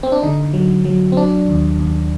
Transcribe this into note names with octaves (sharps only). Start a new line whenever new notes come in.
C4
D4
D3 D#4
F#3
F#3
C4
F#3 D4
D#2
D#2